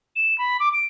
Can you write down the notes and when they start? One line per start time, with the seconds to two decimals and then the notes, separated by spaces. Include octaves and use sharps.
0.16 E7
0.38 B5
0.60 D6
0.73 D7